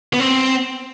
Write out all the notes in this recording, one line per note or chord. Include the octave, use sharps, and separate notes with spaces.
B3
C4